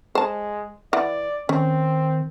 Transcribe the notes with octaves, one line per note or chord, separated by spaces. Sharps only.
G#3 C5 A5
E3 D5 F#5
D#3 C4 C#4